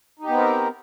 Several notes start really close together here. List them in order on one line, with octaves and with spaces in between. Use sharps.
D#4 G4 B3 C4 A#4